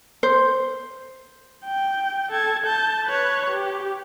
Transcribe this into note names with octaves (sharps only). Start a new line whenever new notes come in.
C5
G5
A4 G#6
A5 G6
B4 C#5
G4